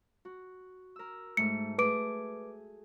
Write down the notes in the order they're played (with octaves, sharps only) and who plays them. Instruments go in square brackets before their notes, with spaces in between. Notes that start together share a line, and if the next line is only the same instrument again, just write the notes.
[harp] F#4
A#4 E6
[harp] G#2 A3 [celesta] C#7
[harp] A3 G#4 [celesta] B4 D6 D7